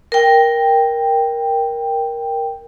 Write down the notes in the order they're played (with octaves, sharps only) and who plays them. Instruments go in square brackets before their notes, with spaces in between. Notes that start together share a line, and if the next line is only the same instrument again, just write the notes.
[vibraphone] A#4 G5